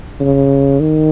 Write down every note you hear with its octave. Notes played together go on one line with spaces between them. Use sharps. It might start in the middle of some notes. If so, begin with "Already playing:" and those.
C#3
D#3